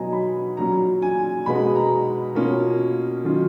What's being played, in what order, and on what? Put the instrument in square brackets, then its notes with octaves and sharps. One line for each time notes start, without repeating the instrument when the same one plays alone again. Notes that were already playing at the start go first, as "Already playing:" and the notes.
Already playing: [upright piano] B2 F#3 B3 D#4 G#5 A#5
B5
A#2 F#3 C#4 A#5
G#5
B2 G#3 B3 B5
A#5
B2 A#3 C#4 F4
D#3 F#3 C#4 F4